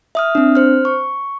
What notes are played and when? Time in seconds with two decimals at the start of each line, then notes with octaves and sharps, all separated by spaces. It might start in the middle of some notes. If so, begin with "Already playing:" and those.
0.15 E5 D#6 F6
0.35 C4 D4
0.55 C5 F6
0.85 C#6